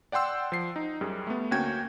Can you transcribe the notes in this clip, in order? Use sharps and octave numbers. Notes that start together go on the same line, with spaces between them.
D5 F#5 G5 C6 E6
F3 C7
D#4
F#2 G3 G#4
A3 B3
D2 A#3 C#4 F#4 G5 G#6